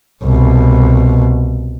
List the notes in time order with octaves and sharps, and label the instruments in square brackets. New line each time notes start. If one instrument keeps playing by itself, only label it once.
[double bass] C2 B2